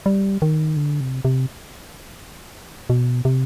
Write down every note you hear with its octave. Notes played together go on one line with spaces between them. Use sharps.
G3
D#3
D3
C3
C3
B2
C3